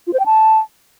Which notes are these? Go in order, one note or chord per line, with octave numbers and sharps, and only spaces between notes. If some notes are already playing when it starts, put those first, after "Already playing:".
F4
C5
G5
A5